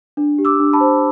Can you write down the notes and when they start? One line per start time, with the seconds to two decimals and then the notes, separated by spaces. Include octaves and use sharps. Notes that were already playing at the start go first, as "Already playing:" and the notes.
0.17 D4
0.38 G4
0.45 D6 E6
0.60 D4
0.73 A5 B5
0.80 C5